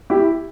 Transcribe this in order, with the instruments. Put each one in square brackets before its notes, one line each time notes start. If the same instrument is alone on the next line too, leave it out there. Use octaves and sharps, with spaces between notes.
[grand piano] E4 G4